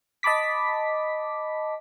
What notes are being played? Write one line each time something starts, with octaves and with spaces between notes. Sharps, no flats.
D#5 A5 B5 D6 B6